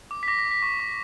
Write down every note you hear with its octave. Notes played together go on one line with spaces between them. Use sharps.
D6
B6
D6 A#6
A#6
D6
B6
C#6 A#6
C#6